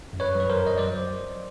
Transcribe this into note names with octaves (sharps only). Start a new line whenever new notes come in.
F#2
B4 C#5
F#3 B4
A#4 C5
F#2
D#5
F#3 C5 D5